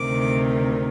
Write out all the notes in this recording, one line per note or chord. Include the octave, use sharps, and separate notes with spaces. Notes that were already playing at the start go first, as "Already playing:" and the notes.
Already playing: D2 C3 D#3 D6